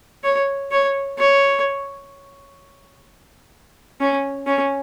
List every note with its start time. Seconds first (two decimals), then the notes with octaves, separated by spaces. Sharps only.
0.24 C#5
0.72 C#5
1.19 C#5
4.00 C#4
4.46 C#4